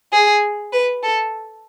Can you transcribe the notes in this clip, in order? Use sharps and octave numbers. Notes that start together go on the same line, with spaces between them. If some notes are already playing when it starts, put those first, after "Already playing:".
G#4
B4
A4